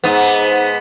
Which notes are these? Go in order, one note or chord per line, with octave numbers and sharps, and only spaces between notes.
G#2 B3